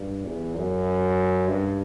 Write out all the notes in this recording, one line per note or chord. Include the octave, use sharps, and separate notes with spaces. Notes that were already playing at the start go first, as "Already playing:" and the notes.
Already playing: G2
E2
F#2
G2